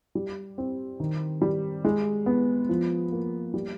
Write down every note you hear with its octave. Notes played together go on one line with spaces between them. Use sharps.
G3
C4
D#3
G3
G#3
B3
F3
A#3
G3